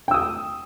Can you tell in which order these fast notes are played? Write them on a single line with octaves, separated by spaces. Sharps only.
G5 E6 D#6